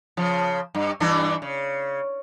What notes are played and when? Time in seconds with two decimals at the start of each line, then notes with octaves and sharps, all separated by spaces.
0.17 C#3 F3
0.75 G2
1.00 G2 E3 D4
1.42 C#3